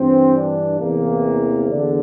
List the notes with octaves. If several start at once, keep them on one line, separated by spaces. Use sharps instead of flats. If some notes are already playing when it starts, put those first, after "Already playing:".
Already playing: G2 E3 C4
D4
E2 C3 E3 A#3
E2 D3 D4